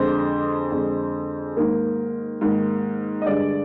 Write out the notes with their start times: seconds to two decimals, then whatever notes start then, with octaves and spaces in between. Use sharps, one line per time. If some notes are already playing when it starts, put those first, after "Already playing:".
Already playing: F2 D3 G#3 C5
0.72 F2 D3 G#3
1.57 G#2 D#3 A#3
2.41 G#2 D#3 A#3
3.22 D#5
3.26 G2 D3 G#3 D5